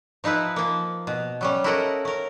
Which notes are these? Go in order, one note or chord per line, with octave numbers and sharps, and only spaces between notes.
F3 D#4 E4 B4
F3 A#3
B2
F#3 G3 C#4
E4 F#4 A4 A#4 D#5 F#5
C#4 A#4